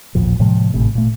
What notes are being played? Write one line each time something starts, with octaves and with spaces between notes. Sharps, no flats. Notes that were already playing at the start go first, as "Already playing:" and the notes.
A1 D#2 A#2 F3
A2 C3 F3 G#3
G#1 A2 C3
A#2 A3